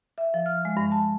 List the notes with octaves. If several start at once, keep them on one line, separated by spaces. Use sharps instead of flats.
E5
F3
F6
G#3
G2
A5